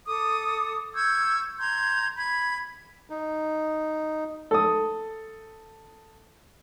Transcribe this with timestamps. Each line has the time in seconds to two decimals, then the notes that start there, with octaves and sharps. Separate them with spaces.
0.06 A4 D6 D#6
0.94 C#6 E6 G6 G#6
1.58 A#5 C6 G6 G#6
2.16 B5 G#6
3.10 D#4
4.51 A4 D#6